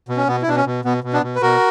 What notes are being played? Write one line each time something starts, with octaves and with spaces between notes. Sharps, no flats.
B2
C#4
B2 B3
E4
B2 D4
C#4
B2
B2 B3
B2
B3 D4
B2
B4
B2 F#4 A#4